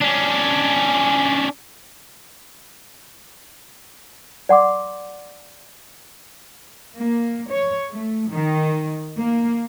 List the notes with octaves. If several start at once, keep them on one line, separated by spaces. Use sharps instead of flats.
C#4 D4
D5 F#5 C6 D6
A#3
C#5
A3
D#3
A#3